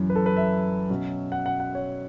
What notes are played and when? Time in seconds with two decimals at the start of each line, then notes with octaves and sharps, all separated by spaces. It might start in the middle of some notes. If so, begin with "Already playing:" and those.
Already playing: F#2 E3 C#4
0.10 B4
0.16 A4
0.26 B4
0.37 E5
0.90 B2 F#3 C#4
1.32 F#5
1.46 F#5
1.60 F#5
1.75 C#5